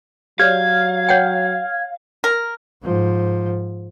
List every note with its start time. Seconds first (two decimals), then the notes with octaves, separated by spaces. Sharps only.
0.39 F#3 G4 C#5 D5 F5 F6 G#6
1.09 C#5 F#5 G5
2.24 A#4
2.83 G#2 F3